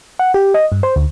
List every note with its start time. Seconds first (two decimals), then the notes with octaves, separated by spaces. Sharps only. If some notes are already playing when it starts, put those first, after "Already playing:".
0.19 F#5
0.34 G4
0.54 D#5
0.72 G2
0.83 C5
0.96 D2